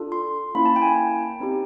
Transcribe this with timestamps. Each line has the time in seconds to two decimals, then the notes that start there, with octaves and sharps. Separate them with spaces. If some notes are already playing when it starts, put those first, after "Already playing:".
Already playing: D4 F4 A4
0.12 C6
0.55 A#3 C#4 E4 B5
0.65 A5
0.76 G5
0.82 G#5
0.87 G5
1.40 C4 D#4 G4